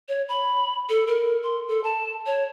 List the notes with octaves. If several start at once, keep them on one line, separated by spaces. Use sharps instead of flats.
C#5
B5
A4
A#4
C6
A4
A5
C#5